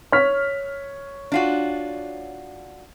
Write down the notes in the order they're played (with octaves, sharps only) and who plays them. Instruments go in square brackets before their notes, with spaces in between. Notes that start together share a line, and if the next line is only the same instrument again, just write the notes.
[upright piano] C#5 F6 B6
[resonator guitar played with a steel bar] D4 F4 F#4